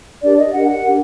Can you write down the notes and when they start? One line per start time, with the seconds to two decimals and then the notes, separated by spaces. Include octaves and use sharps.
0.22 D4 G4 A#4 D5
0.36 D#5
0.52 D4 G4 A#4 F#5
0.67 F#5
0.82 D4 G4 A#4